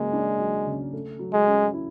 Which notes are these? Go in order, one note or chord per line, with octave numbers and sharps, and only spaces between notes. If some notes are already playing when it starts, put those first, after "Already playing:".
Already playing: C#3 F#3 G#3 A#3
D4
F#3
C#3
A3
F#3
G#3
C#4
E4